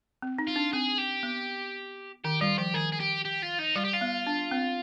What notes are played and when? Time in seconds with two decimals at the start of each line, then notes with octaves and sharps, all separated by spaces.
0.22 C4
0.39 D#4
0.47 F4
0.56 D4
0.73 C4 G#4
0.98 G4
1.23 B3
2.24 D#3 G4
2.41 G3 F4
2.58 F3 G4
2.74 D#3 G#4
2.92 G#4
3.00 G4
3.25 G4
3.43 F4
3.59 D#4
3.76 G3 F4
3.85 G4
3.94 F4
4.01 B3
4.27 D4
4.51 C4